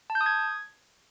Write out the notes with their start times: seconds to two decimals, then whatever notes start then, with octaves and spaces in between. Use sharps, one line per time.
0.10 A5
0.15 G6
0.21 D#6
0.26 G#6